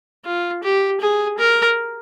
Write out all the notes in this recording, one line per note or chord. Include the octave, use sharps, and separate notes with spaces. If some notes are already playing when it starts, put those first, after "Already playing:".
F4
G4
G#4
A#4